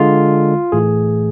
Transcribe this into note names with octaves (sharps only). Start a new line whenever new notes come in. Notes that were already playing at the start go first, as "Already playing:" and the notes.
Already playing: D3 G#3 F4
A2 E3 A3 G#4